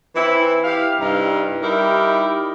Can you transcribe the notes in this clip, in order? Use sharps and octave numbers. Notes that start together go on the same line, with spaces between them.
E3 C4 E4
G4 F5
G2 C3 D#4 E4
G3 D#4 E4 G4 A#4